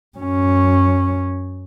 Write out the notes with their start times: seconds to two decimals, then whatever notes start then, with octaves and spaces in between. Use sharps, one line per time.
0.18 F#2 C#4